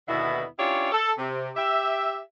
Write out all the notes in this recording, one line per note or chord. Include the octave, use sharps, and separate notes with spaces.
D#2 B2 D3 B3 E4
C#4 D4 E4 F4 G4 C#5
A4
C3
G4 E5